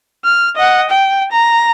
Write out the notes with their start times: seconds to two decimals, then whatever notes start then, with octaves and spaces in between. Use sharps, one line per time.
0.25 F6
0.56 D#5 F#5
0.90 G5
1.32 A#5